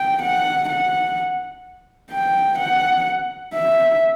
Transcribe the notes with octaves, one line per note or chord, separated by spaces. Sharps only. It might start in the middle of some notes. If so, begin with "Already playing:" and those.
Already playing: G5
F#5
F#5
G5
F#5
E5